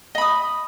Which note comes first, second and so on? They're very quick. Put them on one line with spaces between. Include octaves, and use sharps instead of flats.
D#5 B5 D#6